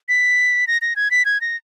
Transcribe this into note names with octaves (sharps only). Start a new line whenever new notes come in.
B6
A#6
A#6
G#6
B6
G#6
A#6